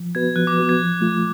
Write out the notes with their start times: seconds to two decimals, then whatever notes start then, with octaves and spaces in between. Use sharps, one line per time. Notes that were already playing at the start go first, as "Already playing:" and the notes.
Already playing: F3
0.15 B3 F#4 B4 G#6
0.36 F3 F#6
0.47 D6
0.58 B3 F#4 B4
0.69 G#6
0.79 F3
1.01 A3 F4